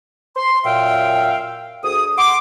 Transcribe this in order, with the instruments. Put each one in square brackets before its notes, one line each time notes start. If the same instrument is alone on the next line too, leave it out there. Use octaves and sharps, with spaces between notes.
[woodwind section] C6
F#2 A#2 E5 F5 G5
D2 G#4 D#6
F#5 C6 D6